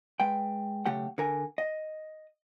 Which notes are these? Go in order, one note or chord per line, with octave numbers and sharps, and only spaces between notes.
G#3 B4 G5
B1 C#3 A3 G4 F#5 G5
D3 A#4 G#5
D#5